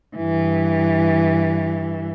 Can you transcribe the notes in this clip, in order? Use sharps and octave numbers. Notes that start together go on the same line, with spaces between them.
G2 E3